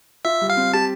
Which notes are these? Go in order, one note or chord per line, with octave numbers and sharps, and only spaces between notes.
F4 E5
G3
F5
C4
G4 A5